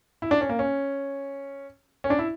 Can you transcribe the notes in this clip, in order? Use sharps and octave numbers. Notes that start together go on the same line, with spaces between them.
E4
D4
C#4
A#3
C#4
C#4
D4
E4